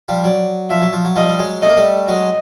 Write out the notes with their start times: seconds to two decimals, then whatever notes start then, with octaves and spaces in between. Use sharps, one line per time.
0.08 F3 G3
0.24 F#3 D5
0.70 F3 E5
0.82 F#3
0.93 F3
1.05 F#3
1.16 F3 G3 D#5
1.29 G3
1.39 F#3 G#3
1.62 A3 D#5
1.69 A#3
1.77 G3 A3
2.08 F#3 G#3 D#5